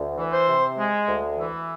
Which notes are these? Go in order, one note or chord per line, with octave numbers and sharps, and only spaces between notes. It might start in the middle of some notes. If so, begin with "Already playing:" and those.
Already playing: D2
E3
C5
C3
G#3
D2
E3